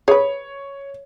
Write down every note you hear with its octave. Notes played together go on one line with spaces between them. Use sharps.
G#4 B4 C#5